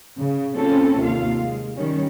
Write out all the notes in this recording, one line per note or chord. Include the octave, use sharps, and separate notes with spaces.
C#3
A#3 C4 C#4 F4 A4
D#2 C3 F4 F5
G#3
D#3 G3 C#4